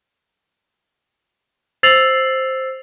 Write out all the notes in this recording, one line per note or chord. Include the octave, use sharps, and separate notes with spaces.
C5 E6 A6 C7 F7 F#7